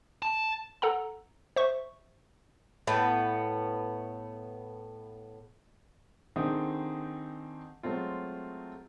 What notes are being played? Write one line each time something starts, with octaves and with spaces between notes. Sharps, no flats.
A5
A4 F#5 A#5
C5 E5 C#6
A2 B3
D3 D#3 C4 D#4 G#4
F#3 G#3 A3 C4 F4